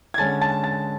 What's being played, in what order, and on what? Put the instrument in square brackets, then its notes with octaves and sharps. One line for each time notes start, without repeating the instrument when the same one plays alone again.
[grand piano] G#6
D3 G#3 C#4 A5 A6
A5 A6
A5 A6